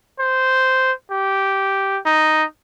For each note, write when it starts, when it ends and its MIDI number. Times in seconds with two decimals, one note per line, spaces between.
0.20 0.92 72
1.11 1.99 67
2.06 2.44 63